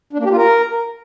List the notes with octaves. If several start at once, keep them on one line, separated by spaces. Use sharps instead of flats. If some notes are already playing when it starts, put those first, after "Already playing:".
D4
A#3
G4
F4
A#4